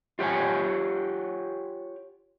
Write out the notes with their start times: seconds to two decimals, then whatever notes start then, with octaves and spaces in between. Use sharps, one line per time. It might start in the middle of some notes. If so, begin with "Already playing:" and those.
0.19 F4 G4 C#5 F#5 G#5